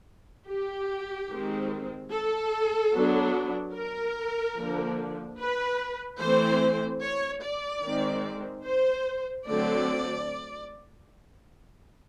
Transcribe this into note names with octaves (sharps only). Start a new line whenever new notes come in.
G4
D#3 G#3 C4
A4
F#3 B3 D4
A#4
D3 F3 A#3 D4
B4
E3 A3 C4 C5
C#5
D5
D#3 G#3 C4
C5
D3 F#3 A3 C4 D5